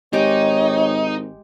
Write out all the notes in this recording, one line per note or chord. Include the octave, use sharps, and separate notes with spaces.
G#1 G#3 D#4 G4 C#5 D6